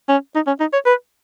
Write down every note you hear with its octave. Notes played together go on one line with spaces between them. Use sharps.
C#4
D#4
C#4
D#4
C#5
B4